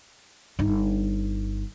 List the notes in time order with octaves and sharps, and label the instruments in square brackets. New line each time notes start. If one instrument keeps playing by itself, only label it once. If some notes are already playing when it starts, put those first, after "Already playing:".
[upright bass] G1 D#4